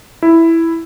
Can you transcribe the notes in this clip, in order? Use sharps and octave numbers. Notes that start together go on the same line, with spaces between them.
E4